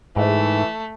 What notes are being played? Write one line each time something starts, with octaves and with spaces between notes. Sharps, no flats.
G#2 E3 A3